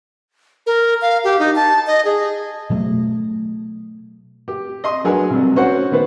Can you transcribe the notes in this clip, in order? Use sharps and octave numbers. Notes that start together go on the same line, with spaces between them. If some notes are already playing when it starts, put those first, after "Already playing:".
A#4
F5
G4
D#4
A5
D#5
G#4
B2 F#3 A3
G4
D#5 C6 D#6
F#3 D4 G#4 A#4 B4
C2 C3
C#4 F#4 C5 F#5
D#3 B3 B4 C5